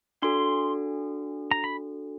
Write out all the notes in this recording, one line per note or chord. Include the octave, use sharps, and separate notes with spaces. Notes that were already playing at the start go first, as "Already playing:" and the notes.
D4 F#4 A4 C6
A#5
B5